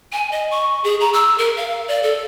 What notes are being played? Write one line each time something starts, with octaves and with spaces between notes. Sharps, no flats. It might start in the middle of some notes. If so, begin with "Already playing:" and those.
G#5
D#5
C#6
G#4
A#5
E6
A#4
F5
D5
A4